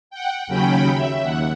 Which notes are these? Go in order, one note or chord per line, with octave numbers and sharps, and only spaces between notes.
F#5 G5
D#2 C#3 F#3 C#4 G5 B5
E5
D#2 F#5